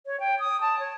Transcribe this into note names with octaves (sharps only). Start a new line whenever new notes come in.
C#5
G5
D#6
A5
C#5